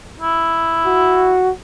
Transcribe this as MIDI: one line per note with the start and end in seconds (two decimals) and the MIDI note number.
0.20 1.42 64
0.86 1.50 66